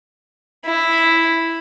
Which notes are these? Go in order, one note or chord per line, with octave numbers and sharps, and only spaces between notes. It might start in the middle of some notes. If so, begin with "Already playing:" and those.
E4